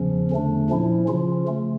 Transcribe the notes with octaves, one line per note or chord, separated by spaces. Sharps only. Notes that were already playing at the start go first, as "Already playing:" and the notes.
Already playing: E2 C#3 F3 C#4
E2 D3 A3 D4
A#2 F3 C#4 E4
C#3 F3 C#4 F4
C#3 A3